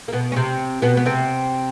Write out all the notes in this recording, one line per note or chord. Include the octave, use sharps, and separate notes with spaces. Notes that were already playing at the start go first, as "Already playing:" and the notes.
A#3
B2 B3
C#4
C3 C4
B2 B3
B3
C3 C4